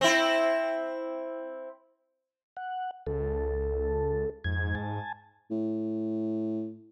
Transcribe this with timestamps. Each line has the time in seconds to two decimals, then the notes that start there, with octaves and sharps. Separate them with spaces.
0.01 C4 E4
2.57 F#5
3.07 C#2 A4
4.44 F2 G#2 G#6
4.75 G#5 A5
5.51 A2